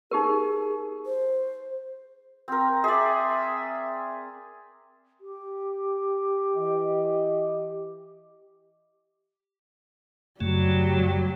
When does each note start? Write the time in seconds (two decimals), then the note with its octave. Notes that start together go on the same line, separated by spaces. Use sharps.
0.11 D#4 G4 G#4 A#4
1.06 C5
2.48 C4 A#4
2.84 G#4 D5 E5
5.21 G4
6.56 E3 D#5
10.41 F#2 C#3 F#3 G3 A3